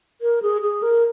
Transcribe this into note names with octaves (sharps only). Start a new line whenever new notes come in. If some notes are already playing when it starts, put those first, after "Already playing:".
A#4
G#4
G#4
A#4